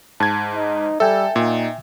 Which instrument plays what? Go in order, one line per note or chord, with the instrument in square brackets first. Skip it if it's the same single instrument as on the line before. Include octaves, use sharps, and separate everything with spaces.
[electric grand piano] G#2 G#6 [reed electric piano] A5
[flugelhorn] D#4
[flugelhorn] G3 [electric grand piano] A4 [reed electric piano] E5 G5 G#5
[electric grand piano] A#2 [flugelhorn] D#4